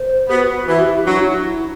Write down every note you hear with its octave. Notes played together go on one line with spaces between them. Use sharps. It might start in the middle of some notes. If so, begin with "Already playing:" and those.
Already playing: C5
B3 F#4 G4
E3 F#4
G4
E4
F#3 D4
E4
E4